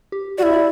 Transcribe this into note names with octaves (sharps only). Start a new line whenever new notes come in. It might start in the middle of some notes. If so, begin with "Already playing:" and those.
G4
F#4 D5
E4 E5
D5